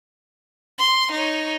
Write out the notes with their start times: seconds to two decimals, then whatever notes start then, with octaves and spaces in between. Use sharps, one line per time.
0.79 C6
1.12 D#4 C#5